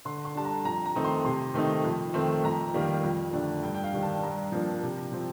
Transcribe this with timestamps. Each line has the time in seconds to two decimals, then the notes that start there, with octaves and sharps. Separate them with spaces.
0.05 D3 C6
0.25 C6
0.35 G3 D4 A5
0.45 A#5
0.65 F2 A#5
0.86 A#5
0.95 D#3 A3 C4 D#4
1.05 C6
1.25 C3 C6
1.54 D#3 A3 C4 D#4
1.85 F2
2.14 D#3 A3 C4
2.44 F2 A#5
2.74 D#3 G3 A#3
3.04 F2
3.33 D3 A3 D4
3.63 G2 G5
3.74 G5
3.84 F5
3.93 D#3 G3 D4
4.03 A5
4.23 G2 A#5
4.52 F3 A#3 D4
4.83 C3
5.12 F3 C4